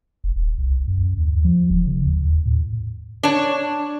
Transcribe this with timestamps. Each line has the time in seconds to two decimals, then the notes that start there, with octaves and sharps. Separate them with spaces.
0.24 F1
0.36 D#1
0.58 C2
0.88 F#2
1.17 D#2
1.45 F3
1.70 E1
1.87 C#3
2.05 D#2
2.34 D#2
2.46 A2
3.23 D4 C#5